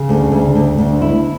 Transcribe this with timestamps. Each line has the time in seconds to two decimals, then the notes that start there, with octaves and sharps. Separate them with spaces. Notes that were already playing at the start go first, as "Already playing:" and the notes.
Already playing: C#3
0.09 D2
0.32 D2
0.55 D2
0.78 D2
1.02 E4